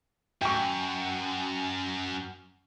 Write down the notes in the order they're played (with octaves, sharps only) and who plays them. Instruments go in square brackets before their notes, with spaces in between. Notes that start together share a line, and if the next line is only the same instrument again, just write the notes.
[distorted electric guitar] F#2 [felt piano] G5 C#6